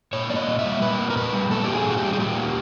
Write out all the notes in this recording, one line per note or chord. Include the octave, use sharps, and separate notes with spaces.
A#2 C#5
A#3 D5
D#5
A#2
E5
G3
A#2 B4
A#3
A#4
A#2 B4
G3
A#2 A4
G4
A#3 G#4
A#2 F#4
G4
G3
G#4
A#2 G4
A#3